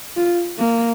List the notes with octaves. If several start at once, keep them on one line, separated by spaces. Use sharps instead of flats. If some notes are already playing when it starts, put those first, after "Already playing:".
F4
A#3